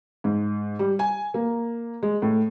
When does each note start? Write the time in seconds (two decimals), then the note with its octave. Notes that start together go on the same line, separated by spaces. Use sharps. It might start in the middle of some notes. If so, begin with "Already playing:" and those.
0.24 G#2
0.79 G3
0.99 G#5
1.34 A#3
2.02 G#3
2.22 A2